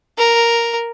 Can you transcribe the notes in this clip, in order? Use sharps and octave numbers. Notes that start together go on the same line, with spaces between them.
A#4